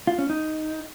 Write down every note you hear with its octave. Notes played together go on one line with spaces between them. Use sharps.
F4
C#4
D#4